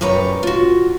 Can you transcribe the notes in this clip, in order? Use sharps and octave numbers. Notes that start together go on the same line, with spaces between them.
F#2 G3 B4 C#5 A#5
F4 F#4